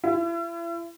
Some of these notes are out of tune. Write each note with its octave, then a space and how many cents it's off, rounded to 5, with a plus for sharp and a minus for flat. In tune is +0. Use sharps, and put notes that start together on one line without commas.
E4 +35